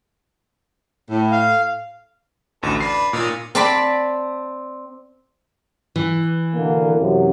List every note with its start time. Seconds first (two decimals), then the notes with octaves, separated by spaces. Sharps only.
1.10 A2
1.32 F5
2.63 A1 D2 A4
2.80 D4 B4 C7
3.13 A#2 D#3 C#4 D#4
3.55 C4 D5 A5 B5
5.96 E3
6.55 B2 D3 A#3
6.99 F#2 C3